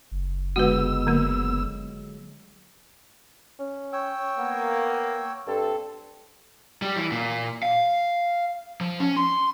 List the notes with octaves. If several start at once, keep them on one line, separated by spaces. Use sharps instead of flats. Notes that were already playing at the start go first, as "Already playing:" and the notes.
F#1
D3 G#3 B3 F4 F#4 B4 E6
D3 F#3 A#3
C#4
C#5 G5 E6
A#3 B3
G2 C4 A4
G3
E3
A#2
F5
F3
C#4
C6